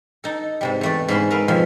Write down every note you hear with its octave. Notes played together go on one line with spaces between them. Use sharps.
D#4 A4
G#2 C3 G3
E2 A3 D5
G#2 D3 C#4 B5 C6
A#4 B4 E5 F5
F2 B2 F3 F4 E5